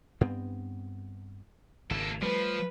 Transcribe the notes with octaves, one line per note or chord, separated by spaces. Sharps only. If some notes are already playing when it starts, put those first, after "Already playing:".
G2 B3 C4
G#1 C#3 A#3 A4
F3 G3 A3 B4